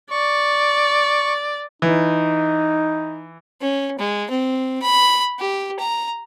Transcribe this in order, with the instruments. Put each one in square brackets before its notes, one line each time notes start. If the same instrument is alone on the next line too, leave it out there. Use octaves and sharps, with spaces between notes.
[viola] D5 [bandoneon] C#6
[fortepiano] E3 [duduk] D#4
[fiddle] C#4
G#3
C4
B5
G4
A#5